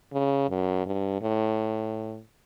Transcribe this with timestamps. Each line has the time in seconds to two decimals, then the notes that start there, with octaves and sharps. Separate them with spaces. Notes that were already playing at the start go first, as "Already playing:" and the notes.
0.13 C#3
0.50 F#2
0.86 G2
1.21 A2